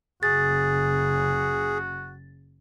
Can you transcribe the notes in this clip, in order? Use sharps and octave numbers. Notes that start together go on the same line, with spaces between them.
F#1 C#3 F#4 G#4 A6